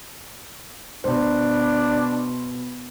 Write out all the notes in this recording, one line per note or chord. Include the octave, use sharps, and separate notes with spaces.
B2 D4 C5